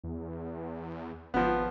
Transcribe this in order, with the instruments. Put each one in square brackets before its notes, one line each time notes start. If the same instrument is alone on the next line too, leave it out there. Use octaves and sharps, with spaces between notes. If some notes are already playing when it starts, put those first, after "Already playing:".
[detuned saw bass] E2
[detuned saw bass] G#1 [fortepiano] F3 B3